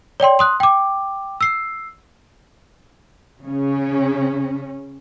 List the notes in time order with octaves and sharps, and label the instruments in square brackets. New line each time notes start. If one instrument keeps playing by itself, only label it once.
[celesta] C#5 D5 G5 C6
C6 D#6 F#6
G5 D6
E6 C7
[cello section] C#3 C#4